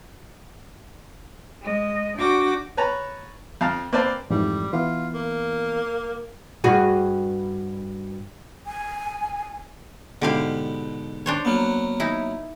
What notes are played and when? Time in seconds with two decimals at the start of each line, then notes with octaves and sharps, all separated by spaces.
1.61 G#3 D#5
2.17 D4 F#4 D5 G5 D6 A#6
2.77 B4 C#5 A5 A#5
3.61 F2 F5 A5
3.93 A#3 C4 B4 C5 D5 A5
4.31 F2 G#2 E3 G3
4.73 E3 B3 F4
5.14 A#3
6.64 G2 F#4 G#4
8.67 G#5
10.22 G#2 B2 D3 G4 F5
11.26 D4 C5 C#5
11.45 F#3 A#3 B3
12.00 D#4 E4